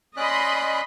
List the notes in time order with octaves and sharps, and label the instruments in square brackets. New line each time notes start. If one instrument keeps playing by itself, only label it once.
[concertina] C#4 D5 F#6 [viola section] D#5 B5 C6